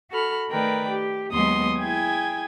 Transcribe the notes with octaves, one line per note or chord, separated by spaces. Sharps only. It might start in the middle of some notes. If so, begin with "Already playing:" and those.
F#4 A4 B5 F6
D#3 A3 A#4 B4 D5 G5
G4
D#2 F#3 G#3 B3 C6 D#6
E4 G#4 G5 G#5 G#6